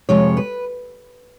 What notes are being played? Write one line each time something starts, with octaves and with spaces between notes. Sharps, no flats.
F2 C3 F3 G#3 C#5
B4